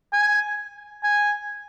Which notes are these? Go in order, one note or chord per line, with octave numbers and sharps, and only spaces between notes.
G#5
G#5